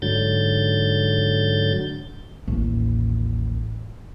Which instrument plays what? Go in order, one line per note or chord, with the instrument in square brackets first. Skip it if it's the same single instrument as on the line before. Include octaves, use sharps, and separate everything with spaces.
[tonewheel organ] G#2 D3 F#3 G6 A6
[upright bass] A1 D#2